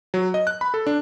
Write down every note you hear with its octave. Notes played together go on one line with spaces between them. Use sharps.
F#3
D#5
F#6
B5
A4
D4